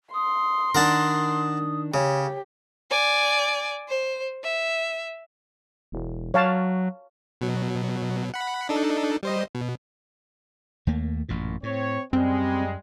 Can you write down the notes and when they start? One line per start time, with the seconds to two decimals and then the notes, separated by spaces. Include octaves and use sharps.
0.14 C6 D#6
0.75 D#3 D4 A#4 F#5 A5 D#6
1.94 C#3 G4 C#5
2.90 D5 G#5
3.88 C5
4.43 E5
5.92 E1
6.34 F#3 C#5 F5 A5
7.41 B2 F#3
8.34 F#5 B5
8.69 D4 D#4 A4
9.23 G3 C5 D#5
9.55 B2
10.87 D#2 A3 A#3
11.29 A1 F#2 A#2
11.63 A2 C4 C#5
12.13 F#2 G3 G#3 C4